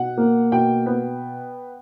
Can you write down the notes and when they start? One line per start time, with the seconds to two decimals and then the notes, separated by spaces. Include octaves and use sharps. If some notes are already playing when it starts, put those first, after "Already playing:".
Already playing: B2 F#5
0.17 A#3
0.52 B2 G5
0.86 B3